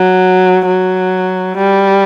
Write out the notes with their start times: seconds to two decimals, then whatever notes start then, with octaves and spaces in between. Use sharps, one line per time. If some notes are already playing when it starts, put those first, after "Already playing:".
Already playing: F#3
0.67 F#3
1.58 G3